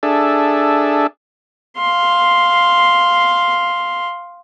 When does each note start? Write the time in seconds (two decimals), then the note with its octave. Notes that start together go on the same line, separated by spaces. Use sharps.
0.03 D4 G#4 A4 E5
1.77 F5 C6